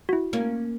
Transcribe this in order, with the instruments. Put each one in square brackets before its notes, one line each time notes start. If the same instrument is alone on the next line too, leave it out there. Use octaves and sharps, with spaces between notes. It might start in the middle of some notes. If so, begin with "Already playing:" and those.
[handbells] F#4
E4
[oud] A#3 C#4